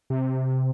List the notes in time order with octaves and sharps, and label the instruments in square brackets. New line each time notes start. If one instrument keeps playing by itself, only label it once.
[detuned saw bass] C3